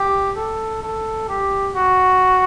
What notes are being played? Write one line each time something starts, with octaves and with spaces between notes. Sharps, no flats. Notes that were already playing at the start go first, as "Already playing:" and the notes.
Already playing: G4
A4
A4
G4
F#4